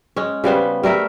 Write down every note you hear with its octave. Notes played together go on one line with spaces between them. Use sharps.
G#3 C#4
C#3 G3 B3 C5
G3 A3 A#4 E5